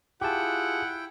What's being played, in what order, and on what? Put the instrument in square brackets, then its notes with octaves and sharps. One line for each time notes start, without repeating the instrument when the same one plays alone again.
[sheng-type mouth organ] E4 G5 [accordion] F4 G#4 [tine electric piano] G4 A5 [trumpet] F#5